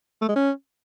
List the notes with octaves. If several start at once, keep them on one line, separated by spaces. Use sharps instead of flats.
A3
G#3
C#4